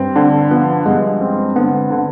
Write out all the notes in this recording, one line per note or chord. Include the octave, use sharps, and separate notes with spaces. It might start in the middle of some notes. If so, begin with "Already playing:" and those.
Already playing: G2 C4
D3 D4
F3 B3
G2 G#3
C4
D3 B3
D3